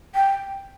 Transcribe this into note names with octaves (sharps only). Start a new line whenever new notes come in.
G5